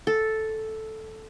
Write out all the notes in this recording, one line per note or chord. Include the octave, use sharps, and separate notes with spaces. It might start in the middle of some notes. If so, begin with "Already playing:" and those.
A4